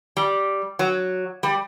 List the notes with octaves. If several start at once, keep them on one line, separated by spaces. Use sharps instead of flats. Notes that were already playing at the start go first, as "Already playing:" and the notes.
G3
F#3
G3